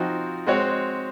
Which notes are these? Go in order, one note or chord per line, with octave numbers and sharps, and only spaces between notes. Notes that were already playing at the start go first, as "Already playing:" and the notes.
Already playing: F3 C4 D#4 F#4
G#3 C4 F#4 C#5